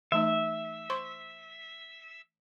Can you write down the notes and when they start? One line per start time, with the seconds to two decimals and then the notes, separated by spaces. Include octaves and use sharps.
0.12 E3 A3 D#4 E5
0.90 C5 C6 C#6